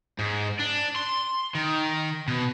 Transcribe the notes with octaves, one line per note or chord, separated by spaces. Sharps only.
G#2
D4
C6
D#3
B2